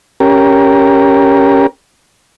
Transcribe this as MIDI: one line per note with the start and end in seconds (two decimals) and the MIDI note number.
0.20 1.66 61
0.20 1.66 67
0.20 1.66 70